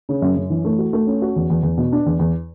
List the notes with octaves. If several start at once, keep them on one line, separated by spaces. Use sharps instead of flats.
C#3
F#2
F#2
E3
A3
F#4
A3
C#4
F#4
E2
E2
E2
B2
D4
E2
E2